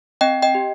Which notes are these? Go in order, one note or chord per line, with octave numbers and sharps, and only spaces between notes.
C4 D#5 G5
D#5 G5
G4